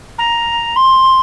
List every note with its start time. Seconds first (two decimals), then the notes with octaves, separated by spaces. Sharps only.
0.18 A#5
0.76 C6